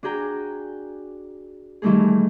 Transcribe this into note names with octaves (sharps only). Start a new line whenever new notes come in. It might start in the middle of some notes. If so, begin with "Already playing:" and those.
D4 F#4 G#4 G5 A#5
D#3 E3 G3 A3 D#4 G#4